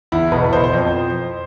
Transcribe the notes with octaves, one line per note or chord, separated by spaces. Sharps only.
E2 E4
B2 B4
B4
B2 C5
C5
F2